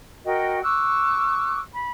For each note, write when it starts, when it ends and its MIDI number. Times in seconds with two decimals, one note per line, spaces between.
0.25 0.60 66
0.25 0.60 70
0.25 0.60 75
0.25 0.60 79
0.63 1.59 85
0.63 1.59 86
0.63 1.59 88
0.63 1.59 90
1.74 1.91 83